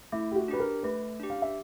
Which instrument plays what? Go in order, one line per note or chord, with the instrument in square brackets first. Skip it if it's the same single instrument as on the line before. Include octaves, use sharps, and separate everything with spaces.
[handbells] A3 [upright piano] E4
[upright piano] G4
F#4
[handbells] D4 G4 [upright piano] B4
[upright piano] A#4
[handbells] A3 [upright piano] B4
[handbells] D4 G4
[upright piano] F5
E5